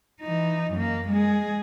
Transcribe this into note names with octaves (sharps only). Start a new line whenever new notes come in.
E3 D#4
F#2 A#3
G#3 G#4